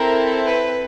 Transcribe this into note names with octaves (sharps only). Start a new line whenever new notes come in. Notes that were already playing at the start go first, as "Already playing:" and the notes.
Already playing: C4 E4 A4 A#4
B4